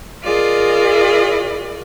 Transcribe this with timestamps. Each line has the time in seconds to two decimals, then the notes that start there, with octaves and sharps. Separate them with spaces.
0.22 F4 G#4 A#4 D5 D#5